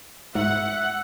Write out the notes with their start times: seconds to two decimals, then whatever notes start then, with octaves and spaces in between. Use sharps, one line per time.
0.35 G#2 E5 F#5